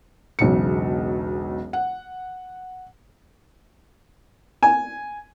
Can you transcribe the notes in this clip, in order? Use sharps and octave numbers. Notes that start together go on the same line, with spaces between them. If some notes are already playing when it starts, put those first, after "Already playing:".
E1 B1 C#3 C#7
F#5
G#5